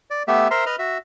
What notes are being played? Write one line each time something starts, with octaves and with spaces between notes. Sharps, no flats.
D5
A3 B3 G4 E5
A#4 C5 E5 A#5 C6
B4 D#5 F6
F#4 E5